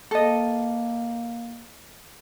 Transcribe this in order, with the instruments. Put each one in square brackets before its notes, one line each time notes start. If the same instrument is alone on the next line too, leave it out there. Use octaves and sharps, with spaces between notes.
[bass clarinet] A#3 [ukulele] A4 D#5